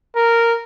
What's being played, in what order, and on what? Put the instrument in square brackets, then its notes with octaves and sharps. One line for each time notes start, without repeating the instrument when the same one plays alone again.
[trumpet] A#4